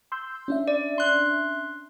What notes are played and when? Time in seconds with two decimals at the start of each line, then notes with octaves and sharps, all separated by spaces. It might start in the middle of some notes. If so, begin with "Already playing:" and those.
0.12 C6 E6 G6
0.48 C#4 D4 E5
0.68 D5
0.98 C6 F#6